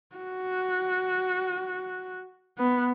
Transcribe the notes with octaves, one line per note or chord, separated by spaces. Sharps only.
F#4
B3